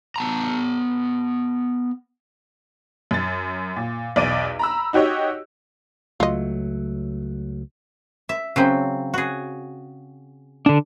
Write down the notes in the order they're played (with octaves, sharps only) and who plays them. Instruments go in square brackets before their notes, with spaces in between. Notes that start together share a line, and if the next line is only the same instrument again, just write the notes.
[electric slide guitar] B3 A5 A#5
[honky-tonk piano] F#2 A6
A#2
B1 E2 D5 D7 D#7
A#5 B5 E6
D#4 F#4 G4 C#5 D#5
[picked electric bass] C#2 F#3 A3 [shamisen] F4 D#5
[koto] E5
C#3 F#3 C4
F#4 G#4
[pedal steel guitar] D3 D4